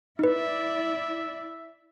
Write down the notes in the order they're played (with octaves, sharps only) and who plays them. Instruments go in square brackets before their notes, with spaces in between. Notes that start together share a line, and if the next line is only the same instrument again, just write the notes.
[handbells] D#4 B4 [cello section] E4 D5 [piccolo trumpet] E5